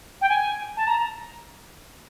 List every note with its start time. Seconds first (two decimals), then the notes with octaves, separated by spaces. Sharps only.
0.21 G5
0.28 G#5
0.76 A5
0.87 A#5